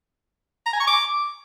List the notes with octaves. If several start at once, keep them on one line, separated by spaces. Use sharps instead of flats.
A#5
G#5
C#6
D6